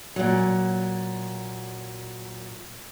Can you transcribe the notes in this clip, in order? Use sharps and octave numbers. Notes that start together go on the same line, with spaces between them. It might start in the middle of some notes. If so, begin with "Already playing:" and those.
A#2 F#3